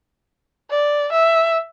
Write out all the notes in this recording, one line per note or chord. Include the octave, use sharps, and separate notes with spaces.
D5
E5